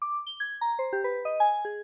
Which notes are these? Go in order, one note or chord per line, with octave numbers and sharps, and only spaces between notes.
D6
G7
G#6
A#5
C5
G4
B4
D#5
G#5
G#4